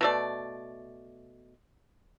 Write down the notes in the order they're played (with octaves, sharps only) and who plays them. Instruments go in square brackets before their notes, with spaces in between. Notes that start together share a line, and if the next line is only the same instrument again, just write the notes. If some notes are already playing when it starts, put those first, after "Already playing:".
[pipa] B2 A3 D5